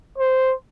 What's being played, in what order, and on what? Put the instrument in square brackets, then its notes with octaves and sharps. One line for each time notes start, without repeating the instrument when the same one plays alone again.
[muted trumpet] C5